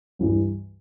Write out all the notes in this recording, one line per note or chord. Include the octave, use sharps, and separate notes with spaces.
G2 E3 G3